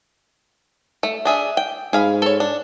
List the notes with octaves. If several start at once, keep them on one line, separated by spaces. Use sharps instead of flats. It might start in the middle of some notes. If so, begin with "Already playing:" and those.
A3
D4 G#4 E5
G5
G#2 G#4 F5 B5
A4 C#5
D4